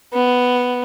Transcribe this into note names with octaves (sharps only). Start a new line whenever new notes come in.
B3